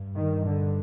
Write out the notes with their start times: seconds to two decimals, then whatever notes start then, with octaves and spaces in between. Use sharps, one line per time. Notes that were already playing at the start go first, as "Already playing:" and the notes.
Already playing: G2
0.15 D#3
0.45 D3